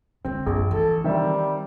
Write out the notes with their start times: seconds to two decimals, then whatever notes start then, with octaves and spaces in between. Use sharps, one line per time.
0.25 D3 G#3 C4
0.46 A#1 F#2 A#3
0.71 E3 D4 A4
1.04 D#3 G3 C4 E5